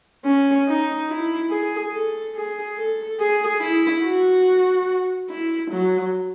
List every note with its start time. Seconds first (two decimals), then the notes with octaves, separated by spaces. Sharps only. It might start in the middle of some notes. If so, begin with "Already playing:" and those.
0.25 C#4
0.67 D#4
1.09 E4
1.51 G#4
1.93 A4
2.35 G#4
2.77 A4
3.19 G#4
3.61 E4
4.03 F#4
5.30 E4
5.71 F#3